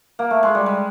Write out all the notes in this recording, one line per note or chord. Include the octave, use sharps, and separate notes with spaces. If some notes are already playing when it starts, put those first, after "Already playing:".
A#3
A3
G#3
G3
G#3